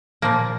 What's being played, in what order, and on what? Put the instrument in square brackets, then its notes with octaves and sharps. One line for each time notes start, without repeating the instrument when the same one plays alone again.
[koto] A#2 F3 A#3